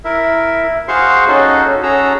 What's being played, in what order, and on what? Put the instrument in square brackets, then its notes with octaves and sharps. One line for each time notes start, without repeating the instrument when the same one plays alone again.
[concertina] E4 A#4 E5
F#4 G#4 C5 F5 C6 C#6
C#4 D#4 F#4 A4
C#4 F#4 G#4 A4 A#5 E6